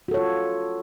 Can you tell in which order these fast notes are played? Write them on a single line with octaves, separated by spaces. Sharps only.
F#4 A4 C#5 F4